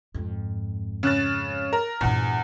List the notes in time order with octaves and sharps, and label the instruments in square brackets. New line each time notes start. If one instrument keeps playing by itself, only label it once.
[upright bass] F2 G#2
[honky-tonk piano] C#3 F#6 A6
A#4
[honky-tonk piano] E2 [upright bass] G2 A#2